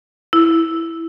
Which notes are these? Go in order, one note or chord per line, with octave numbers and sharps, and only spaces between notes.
E4